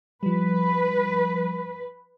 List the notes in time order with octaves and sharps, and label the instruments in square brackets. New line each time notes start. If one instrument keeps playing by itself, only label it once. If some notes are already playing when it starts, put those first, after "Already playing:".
[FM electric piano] F3 G3 [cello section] B4